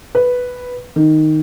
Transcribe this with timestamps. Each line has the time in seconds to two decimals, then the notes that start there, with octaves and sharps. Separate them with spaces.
0.15 B4
0.96 D#3